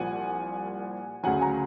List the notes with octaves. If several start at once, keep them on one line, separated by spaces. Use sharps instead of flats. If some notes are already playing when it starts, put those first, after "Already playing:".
Already playing: C2 A#2 F3 F#5 G#5
D2 C#3 F#3 F#5 G#5
G#5 A#5